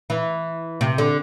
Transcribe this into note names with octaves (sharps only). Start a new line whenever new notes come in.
E3
C3
D3